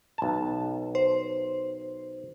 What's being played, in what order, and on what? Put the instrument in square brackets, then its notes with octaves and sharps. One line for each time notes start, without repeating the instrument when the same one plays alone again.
[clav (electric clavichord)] B1 A5
[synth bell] C5